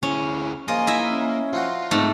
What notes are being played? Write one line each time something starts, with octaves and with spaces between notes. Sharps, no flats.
D2 C#4 E4 G#4
F3 A#3 F4 G#4 D#5 G#5
E4 D#5 E5
C#4
F3 D#4 F4 F#4
G#2 A3 B3 C4 F4